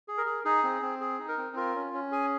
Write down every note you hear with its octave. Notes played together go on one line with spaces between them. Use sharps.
G#4
A#4
G#4
D#4 G#4
C4
C4
G#4
D#4
A#4
C4
F4 A#4
C#4
C#4
G#4 G#5